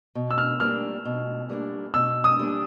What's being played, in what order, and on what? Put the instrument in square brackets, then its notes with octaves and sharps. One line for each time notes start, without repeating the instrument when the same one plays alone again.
[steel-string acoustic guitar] B2
[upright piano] E6
F6
[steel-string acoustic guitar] G3 A#3 D4 [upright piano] F6
[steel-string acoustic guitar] B2
G3 A#3 D4
[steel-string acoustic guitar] B2 [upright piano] E6
[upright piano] D#6
[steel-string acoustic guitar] G3 A#3 D4